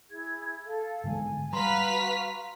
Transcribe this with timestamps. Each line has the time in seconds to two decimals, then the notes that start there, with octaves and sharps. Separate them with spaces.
0.10 E4 G#4 G#6
0.65 A4 F5
1.04 G#2 D3 G#3 G#5
1.53 G3 F#4 B4 F5 A#5 C6 F6 B6